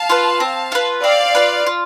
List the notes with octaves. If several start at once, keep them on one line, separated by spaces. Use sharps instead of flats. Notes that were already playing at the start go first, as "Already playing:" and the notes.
Already playing: F5 A5
F4 B4
C4
F4 B4
C4 D5 F5
F4 B4
F4